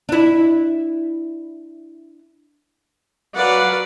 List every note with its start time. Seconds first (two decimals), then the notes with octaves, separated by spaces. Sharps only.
0.09 D4 E4
3.35 F#3 B4 D5 F5 F#5